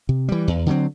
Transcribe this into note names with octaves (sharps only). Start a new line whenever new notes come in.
C3
E3 G3
E2
D3 F#3 C4